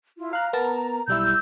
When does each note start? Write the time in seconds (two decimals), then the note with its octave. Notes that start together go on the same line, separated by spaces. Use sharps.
0.18 E4 F4
0.33 F5 A#5 F#6
0.53 B3 A#4 A5
1.08 B1 G3 E4 E6 G6